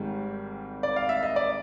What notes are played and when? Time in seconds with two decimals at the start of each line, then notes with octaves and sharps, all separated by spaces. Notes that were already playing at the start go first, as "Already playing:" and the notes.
Already playing: G#1 G#2 D#3 G3
0.83 D5
0.96 F5
1.09 E5
1.23 D#5
1.36 D5